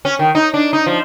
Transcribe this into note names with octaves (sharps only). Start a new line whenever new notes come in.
C#4
D#3
D#4
D4
D#4
F3